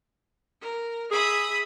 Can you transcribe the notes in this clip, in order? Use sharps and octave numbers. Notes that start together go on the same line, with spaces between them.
A#4
G#4 E5 B5 D#6